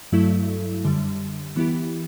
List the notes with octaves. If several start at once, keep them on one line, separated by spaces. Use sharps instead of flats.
G2 F#3 A3 E4 A4
F#2 D3 G3
E3 B3 E4 G4